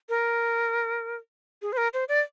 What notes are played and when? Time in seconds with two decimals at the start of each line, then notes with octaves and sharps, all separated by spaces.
0.09 A#4
1.62 G#4
1.73 C5
1.77 A#4
1.94 C5
2.09 D5